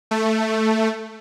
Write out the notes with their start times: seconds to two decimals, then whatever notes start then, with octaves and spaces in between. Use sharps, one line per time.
0.11 A3